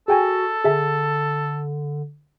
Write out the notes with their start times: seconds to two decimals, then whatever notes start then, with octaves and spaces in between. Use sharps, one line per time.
0.08 F#4 G#4 A4 G5 G#5
0.64 D3 G#4 E5 A5